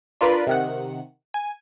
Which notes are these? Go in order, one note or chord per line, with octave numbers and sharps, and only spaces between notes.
D4 F4 A#4 B4 D5 B5
C3 D#3 F#5
G#5